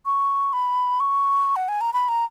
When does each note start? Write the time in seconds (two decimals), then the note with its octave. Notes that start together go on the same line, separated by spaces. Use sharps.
0.06 C#6
0.53 B5
1.00 C#6
1.56 F#5
1.69 G#5
1.81 A#5
1.93 B5
2.08 A#5